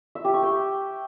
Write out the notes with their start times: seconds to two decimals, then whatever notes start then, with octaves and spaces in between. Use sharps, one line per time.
0.15 E5
0.25 G4
0.34 C#6
0.43 G5